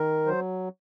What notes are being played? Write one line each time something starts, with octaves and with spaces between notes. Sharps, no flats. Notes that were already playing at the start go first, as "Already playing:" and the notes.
Already playing: D#3 A#4
F#3 C5